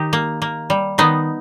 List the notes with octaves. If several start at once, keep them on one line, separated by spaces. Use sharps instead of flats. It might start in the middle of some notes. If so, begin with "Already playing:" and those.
Already playing: D#3 D#4 G4
A#3
A#3
G3
D#3 B3 D#4